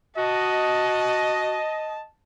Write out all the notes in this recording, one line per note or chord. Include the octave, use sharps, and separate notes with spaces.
F#4 D#5 A5